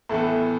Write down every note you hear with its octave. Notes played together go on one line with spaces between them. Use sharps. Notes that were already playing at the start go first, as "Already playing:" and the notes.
A2 E3 B3 A4